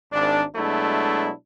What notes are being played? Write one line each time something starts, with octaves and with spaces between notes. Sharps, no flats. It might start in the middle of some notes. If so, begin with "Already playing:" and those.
G#1 D4
B2 F#3 G#3 A3 D4 E4